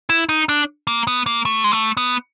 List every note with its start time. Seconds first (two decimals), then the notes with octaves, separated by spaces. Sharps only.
0.10 E4
0.29 D#4
0.49 D4
0.87 A#3
1.07 B3
1.26 A#3
1.45 A3
1.64 G#3
1.72 A3
1.97 B3